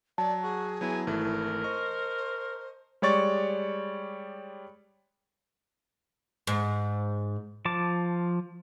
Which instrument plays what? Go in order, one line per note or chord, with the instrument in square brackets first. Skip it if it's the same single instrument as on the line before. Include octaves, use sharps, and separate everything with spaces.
[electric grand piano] F#3 [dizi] D5 [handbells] A5
[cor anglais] F#4 [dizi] G#4
[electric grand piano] F#3 B3 E4 [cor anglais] G#5
[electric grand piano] G#1 E3 A3 [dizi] E4 [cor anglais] A#4
[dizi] C5 [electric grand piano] D#5 C#6
[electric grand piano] G3 G#3 C#5 D5 C#6 A6
[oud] G#2
[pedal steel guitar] F3 A5 D6